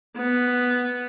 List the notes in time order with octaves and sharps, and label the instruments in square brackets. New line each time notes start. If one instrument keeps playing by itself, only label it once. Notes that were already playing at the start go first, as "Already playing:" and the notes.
[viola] B3